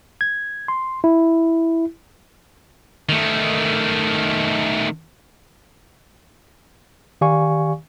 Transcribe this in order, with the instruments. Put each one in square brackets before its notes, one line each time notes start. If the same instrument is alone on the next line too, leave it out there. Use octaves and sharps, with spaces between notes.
[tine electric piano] G#6
C6
E4
[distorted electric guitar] D#3 A3
[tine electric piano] D#3 G4 D5 F5 G#5 C#6